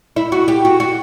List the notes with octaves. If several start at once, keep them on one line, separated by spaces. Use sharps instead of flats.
E4
F#4
G4
F#4
F#4